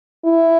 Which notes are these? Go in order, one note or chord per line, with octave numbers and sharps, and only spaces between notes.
E4